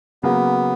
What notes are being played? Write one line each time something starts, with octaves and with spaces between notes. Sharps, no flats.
C#3 F#3 A#3 B3